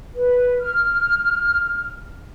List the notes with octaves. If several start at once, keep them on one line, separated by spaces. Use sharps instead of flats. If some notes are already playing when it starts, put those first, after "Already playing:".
B4
F6